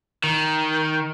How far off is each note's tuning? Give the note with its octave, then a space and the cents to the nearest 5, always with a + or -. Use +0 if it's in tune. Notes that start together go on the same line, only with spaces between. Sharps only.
D#3 +5